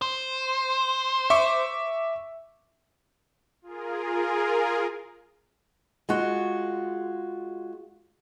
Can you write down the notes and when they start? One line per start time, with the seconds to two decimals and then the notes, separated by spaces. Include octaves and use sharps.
0.02 C5
1.30 E5 C#6 D6
3.62 F4 G#4 A#4
6.09 G#3 F4 F#4